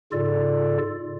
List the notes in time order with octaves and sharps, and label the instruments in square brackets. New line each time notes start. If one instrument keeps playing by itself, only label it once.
[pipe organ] G#2 C#3 F4 A4 D5